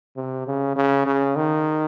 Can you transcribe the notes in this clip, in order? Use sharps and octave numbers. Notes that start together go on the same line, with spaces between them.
C3
C#3
C#3
C#3
D#3